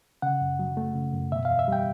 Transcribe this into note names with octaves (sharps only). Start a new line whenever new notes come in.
C#3 F#5
F#2
F#3
A3
C#3
F#2
B2 E5
F5
E2
E5
G3 G5